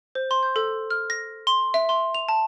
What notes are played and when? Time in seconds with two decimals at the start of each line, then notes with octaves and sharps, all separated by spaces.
0.15 C5
0.31 C6
0.43 G6
0.56 A4
0.90 F6
1.10 A#6
1.47 C6
1.74 E5
1.89 C6
2.15 F7
2.29 A5